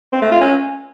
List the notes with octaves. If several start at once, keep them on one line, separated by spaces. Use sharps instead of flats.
C4
A3
F4
C#4